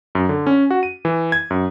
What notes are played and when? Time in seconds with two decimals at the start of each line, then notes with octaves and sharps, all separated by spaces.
0.15 F#2
0.29 D3
0.47 C#4
0.71 F#4
0.83 D#7
1.05 E3
1.32 G#6
1.50 F#2